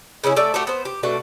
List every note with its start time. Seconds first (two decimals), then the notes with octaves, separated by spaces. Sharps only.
0.24 C#3 G#3 C#4 E4
0.36 A3 D5 E5
0.54 A3 F#4 G4 A4
0.67 B3 C5
0.85 G4
1.03 B2 A3 D4 F#4